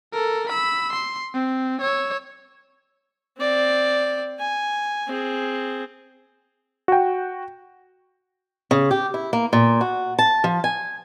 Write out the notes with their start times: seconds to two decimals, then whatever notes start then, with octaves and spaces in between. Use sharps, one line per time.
0.13 A4 A#4
0.49 B5 E6
0.92 C6
1.34 C4
1.81 C#5 E6
3.38 C4 D5
4.40 G#5
5.08 C4 G#4
6.88 F#4 G5
8.71 C#3
8.91 G4
9.14 E4
9.33 A#3
9.53 A#2
9.81 F#4
10.18 A5
10.44 F3
10.64 G#5